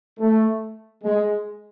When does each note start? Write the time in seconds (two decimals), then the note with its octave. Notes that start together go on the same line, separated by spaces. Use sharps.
0.19 A3
1.04 G#3